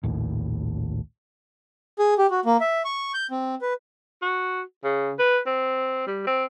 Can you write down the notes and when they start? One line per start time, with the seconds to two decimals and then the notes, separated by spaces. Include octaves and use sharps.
0.03 A#1 D#2 A2
1.99 G#4
2.18 G4
2.30 F#4
2.45 A#3
2.61 E5
2.85 C#6
3.14 G6
3.31 C4
3.62 B4
4.22 F#4
4.84 C#3
5.19 B4
5.46 C4
6.07 G3
6.27 C4